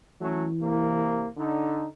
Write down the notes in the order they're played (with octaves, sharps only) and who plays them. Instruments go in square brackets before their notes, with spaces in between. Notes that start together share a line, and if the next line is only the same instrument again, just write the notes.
[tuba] E3 [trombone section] F#3 A3 C#4
[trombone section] C2 A#3
D3 D#4